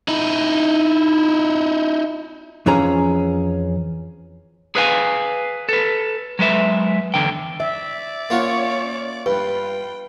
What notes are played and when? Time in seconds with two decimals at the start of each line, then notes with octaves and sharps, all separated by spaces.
0.08 D#4 E4
2.66 F2 E3 F3 C#4 G#4 A#5
4.75 G#4 B4 F5 G5 G#5
5.69 A4 B4
6.39 F#3 G#3 B4 E5
7.14 E2 D3 G5
7.60 D5 E5
8.30 A#3 C#4 F4 F#4 C#5
9.26 G2 F4 B4 G5